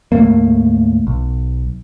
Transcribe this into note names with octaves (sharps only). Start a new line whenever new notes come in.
D2 G#2 A3 A#3
B1